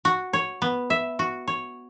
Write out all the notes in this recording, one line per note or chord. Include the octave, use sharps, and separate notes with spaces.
F#4
C#5
B3
E5
F#4
C#5